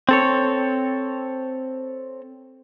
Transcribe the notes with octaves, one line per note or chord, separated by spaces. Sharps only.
C4 A4 C#5